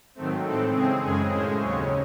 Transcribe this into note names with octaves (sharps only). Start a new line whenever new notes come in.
G#2 D#3 F#3 A3 C4
A2 E3 C4 A4
C#3 G#3 C4 G#4
F#2 C#3 G#3 G#4
A2 G#3 C#4 C5
D#2 C#3 F#3 C#5